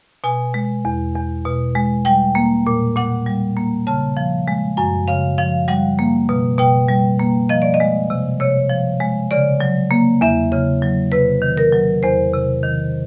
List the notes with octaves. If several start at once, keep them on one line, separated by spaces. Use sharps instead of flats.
B2 G#5
G#3
E2
E2
B2
G#3
G3 G5
A#3
A#2
A#2 F#5
G3
A#3
C#3 A5
F3
G#3
F#2 G#5
C#3 F5
F3 F5
G3 F#5
A#3
B2
B2 G5
G3
A#3
F3 D#5
D5
D#5
G#3
C3
C3 C#5
F3
G#3
C#3 D5
F#3
A#3
E2 E5
C#3
F#3
C3 B4
D#3
A#4
F#3
E2 C5
C3
D#3